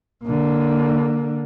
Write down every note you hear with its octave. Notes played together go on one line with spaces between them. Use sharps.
D3 A#3